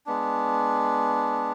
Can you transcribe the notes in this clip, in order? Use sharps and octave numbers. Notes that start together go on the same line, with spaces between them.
G#3 B3 D4